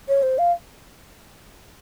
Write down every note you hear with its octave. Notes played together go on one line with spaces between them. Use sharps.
C#5
C5
F5